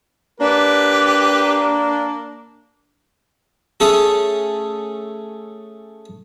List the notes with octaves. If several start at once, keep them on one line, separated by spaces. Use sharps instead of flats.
A#3 D4 G4 B4
A3 C#4 G#4 A4